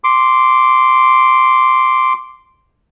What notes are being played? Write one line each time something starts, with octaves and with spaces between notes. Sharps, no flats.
C6 D6